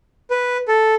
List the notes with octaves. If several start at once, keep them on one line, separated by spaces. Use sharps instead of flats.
B4
A4